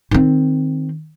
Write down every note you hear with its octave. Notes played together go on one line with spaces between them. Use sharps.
D#3 C4